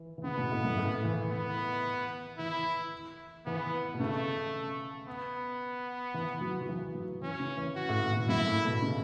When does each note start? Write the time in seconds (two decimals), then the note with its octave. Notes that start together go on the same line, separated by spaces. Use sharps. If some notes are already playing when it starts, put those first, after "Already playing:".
Already playing: E3
0.18 E3
0.24 C#3 B3
0.38 B2
0.52 A2
0.64 F#2
0.78 A2
1.04 E3
1.31 E3 B3
2.38 E3 E4
3.46 E3 B3
3.94 B2
4.00 C#3 A3
5.08 B3
6.14 E3
6.41 F#3
6.61 F#3
6.69 E3
6.95 F#3
7.22 E3 C#4
7.40 C#3
7.57 E3
7.76 F#4
7.89 A2
8.03 A2
8.15 B2
8.29 F#2 E4
8.47 A2
8.65 B2
8.82 C#3